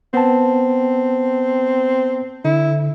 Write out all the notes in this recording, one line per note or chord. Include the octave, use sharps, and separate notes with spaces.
B3 C4 A5
D3 E4